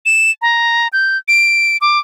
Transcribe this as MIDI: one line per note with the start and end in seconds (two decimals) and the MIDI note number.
0.06 0.31 100
0.42 0.88 82
0.93 1.18 91
1.28 1.77 98
1.81 1.99 86